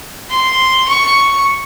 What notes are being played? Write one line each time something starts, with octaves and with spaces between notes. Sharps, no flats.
C6
C#6